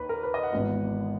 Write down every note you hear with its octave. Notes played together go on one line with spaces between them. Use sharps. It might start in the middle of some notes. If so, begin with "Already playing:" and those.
Already playing: D#2 D#3 A#3 B4
A#4
B4
D#5
F#5
G#1 G#2 E3 B3